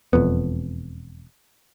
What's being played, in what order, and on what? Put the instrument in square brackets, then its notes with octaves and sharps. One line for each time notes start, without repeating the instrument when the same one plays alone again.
[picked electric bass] E1 F2 B3